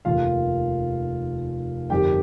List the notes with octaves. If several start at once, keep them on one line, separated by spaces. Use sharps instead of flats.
F1 D#2 D#3 F4 F5
G1 F2 D#3 G4 G5